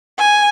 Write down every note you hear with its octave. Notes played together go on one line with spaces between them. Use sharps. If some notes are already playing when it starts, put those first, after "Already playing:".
G#5